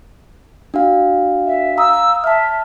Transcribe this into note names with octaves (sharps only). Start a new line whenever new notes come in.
D4 F#4 F5
E5
F5 A#5 D#6 E6
E5 A5 F6